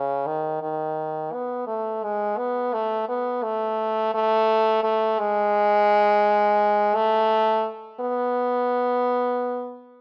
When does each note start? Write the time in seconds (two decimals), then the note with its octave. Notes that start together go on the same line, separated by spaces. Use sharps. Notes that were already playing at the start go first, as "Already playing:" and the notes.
Already playing: C#3
0.26 D#3
0.62 D#3
1.33 B3
1.67 A3
2.03 G#3
2.38 B3
2.74 A3
3.09 B3
3.43 A3
4.14 A3
4.83 A3
5.19 G#3
6.95 A3
8.00 B3